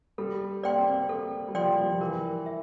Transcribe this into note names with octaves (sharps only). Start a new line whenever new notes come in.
G3 A4
A#3 D5 G5 C6
C4
A#3
A4
G3
F3 D5 G5 C6
G3
F3
E3 A#4
E5